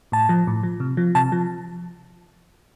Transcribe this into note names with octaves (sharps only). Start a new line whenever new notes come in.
A2 A5
F3
A2
F3
C3
F3
C3 A5
F3